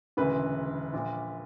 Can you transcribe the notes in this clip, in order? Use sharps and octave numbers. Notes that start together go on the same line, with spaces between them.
E1 D2 C#3 E3 B4
A#1 A#2